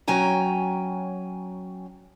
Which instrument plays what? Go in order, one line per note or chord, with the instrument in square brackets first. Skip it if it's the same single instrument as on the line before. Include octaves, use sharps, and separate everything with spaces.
[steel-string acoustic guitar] F#3 C#4 G5 G#5 A#5